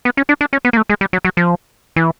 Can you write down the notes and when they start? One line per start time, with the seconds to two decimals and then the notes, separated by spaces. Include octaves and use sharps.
0.05 B3
0.17 C#4
0.29 D4
0.41 D4
0.53 C#4
0.65 B3
0.73 A#3
0.77 A3
0.90 G#3
1.01 G3
1.13 F#3
1.25 F#3
1.37 F3
1.96 E3